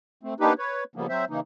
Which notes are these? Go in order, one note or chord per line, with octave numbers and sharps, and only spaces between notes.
A3 C4
A#3 B3 D4 D#4 G4 B4
B4 C#5
C#3 F3 G3 A#3 B3
F#3 C4 C5 E5
C#3 E3 A#3 D#4